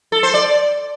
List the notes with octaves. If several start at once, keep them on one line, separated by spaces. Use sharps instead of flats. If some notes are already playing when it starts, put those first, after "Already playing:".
A4
C5
D5